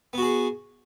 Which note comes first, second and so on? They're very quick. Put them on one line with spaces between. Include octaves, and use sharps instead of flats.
B3 F#4 G#4